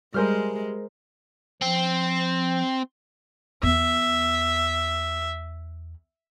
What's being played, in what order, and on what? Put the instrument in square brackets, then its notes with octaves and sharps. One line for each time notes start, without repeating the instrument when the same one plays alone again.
[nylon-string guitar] G3 E5 G#5 [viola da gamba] G#3 [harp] A#4 C5 F6
[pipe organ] F3 [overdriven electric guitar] C4
[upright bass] E2 B3 [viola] E5